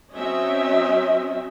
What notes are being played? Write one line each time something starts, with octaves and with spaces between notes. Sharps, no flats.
F#3 C4 C#4 D#5 E5